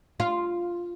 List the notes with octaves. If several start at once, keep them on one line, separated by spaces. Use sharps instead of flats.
F4